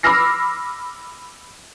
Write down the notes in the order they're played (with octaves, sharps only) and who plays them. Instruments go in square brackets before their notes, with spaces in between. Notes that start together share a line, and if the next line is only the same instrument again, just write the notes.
[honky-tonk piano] B5 D6 E6 F6 A#6 C7